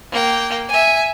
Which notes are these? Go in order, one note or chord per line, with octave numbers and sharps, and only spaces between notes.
A#3 G5
E5 G#5